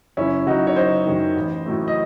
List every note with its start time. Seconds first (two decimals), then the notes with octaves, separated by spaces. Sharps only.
0.17 F#1 C#4 E4
0.47 F#2 D#3 D#4 F#4
0.67 C#5
0.76 F#1 C5 D#5
1.07 F#2 D#3
1.36 A1
1.66 A2 F#3 A3
1.88 D#5